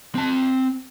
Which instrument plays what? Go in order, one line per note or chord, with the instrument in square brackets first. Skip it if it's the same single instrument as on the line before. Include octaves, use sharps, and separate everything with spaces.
[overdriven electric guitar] C4 A5